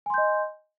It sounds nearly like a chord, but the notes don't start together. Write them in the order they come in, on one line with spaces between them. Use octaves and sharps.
G#5 C6 G6 D#5